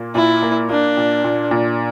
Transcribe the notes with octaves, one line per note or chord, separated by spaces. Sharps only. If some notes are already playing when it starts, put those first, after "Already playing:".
Already playing: A#2 A#3
A#2 E4
A#3
A#3 D4
A#2
A#2
A#2